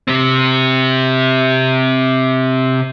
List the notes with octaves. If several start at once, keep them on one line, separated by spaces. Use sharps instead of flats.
C3 C4